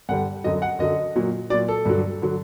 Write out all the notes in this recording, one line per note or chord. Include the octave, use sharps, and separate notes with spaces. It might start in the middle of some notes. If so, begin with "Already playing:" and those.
G2 D3 G3 F#5
F#2 D3 F#3 D#5
F#5
F#2 D3 F#3 D#5
A#2 F#3
A#2 F#3 D5
A4
G2 D3 F#3
D3 F#3